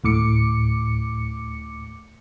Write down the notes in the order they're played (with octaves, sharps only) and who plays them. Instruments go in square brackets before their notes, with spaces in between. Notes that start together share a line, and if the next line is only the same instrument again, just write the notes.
[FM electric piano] D2 A2 D6 C#7